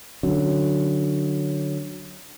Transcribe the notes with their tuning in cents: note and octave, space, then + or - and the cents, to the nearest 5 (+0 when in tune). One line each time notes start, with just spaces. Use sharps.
D3 +15 F#3 +0 C#4 +0